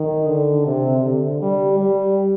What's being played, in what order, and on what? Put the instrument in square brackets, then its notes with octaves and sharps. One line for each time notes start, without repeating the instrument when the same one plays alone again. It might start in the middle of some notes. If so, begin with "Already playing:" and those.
Already playing: [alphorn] D#3
D3
C3
D3
G3
G3